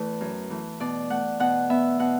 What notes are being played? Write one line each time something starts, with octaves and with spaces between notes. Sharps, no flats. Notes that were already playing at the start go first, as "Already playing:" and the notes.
Already playing: E2 E3 A3 B4
F#2
E3 A3
B2 D5
A3 F#5
B2 F#5
B3 E5
B2 F#5